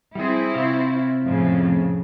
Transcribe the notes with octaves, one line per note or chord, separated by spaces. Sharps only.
G3 C4 E4 G#4
C3 F4 C#5
F2 A2 C#3